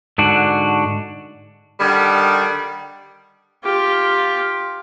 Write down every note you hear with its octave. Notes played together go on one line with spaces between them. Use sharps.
G#2 D3 D4 F#4
D3 D#3 G3
F4 G4